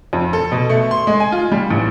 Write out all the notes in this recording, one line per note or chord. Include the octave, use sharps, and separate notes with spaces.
F2
A4
B2
A3
C6
G#3
G#5
F4
G3
A1